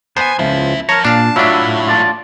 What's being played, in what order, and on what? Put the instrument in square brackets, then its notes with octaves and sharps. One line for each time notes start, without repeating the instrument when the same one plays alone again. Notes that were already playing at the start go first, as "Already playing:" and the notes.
[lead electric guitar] D2 G#5 [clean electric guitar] B3 [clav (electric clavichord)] C5
[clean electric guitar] C#2 F3 [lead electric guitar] B3 E5
[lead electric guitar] F3 [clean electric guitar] A#4 A#5 [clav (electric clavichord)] C#5
[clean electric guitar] A#2 [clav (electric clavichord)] D4 F5 [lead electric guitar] A5
[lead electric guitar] A2 A3 [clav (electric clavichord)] F#3 D4 [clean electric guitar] E4 F4 E5
[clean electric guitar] F4 D5 A5